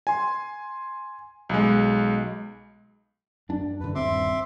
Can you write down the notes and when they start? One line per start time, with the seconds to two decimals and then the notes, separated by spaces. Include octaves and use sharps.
0.07 G#5 C6
1.49 B1 G#3
3.49 F#2 D4
3.80 F#2 D3 B4
3.95 D#1 G2 C4 E5 C6 D6